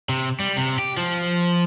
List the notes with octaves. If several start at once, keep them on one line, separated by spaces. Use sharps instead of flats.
C3
G3
C3
G4
F3